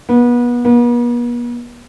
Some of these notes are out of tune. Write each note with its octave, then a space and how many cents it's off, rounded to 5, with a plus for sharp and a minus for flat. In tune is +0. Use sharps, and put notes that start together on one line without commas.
B3 -30
B3 -45